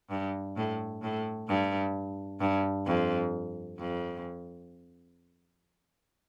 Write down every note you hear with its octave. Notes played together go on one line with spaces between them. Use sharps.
G2
A2
A2
G2
G2
F2
F2